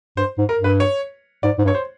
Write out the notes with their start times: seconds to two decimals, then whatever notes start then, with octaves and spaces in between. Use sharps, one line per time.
0.17 G2 C5
0.38 G#2
0.49 A#4
0.59 G2
0.64 B4
0.80 C#5
1.43 G#2 D5
1.59 G#2
1.65 G2
1.68 C#5
1.75 C5